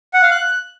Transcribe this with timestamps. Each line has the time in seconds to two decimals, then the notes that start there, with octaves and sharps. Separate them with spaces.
0.14 F#5
0.22 F5
0.31 F#6